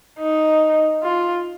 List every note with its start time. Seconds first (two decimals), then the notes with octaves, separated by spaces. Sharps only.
0.19 D#4
1.02 F4